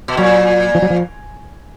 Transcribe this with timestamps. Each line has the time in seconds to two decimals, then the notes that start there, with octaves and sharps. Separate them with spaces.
0.08 B2
0.17 A#2 F#3
0.75 F3
0.82 F#3
0.90 F3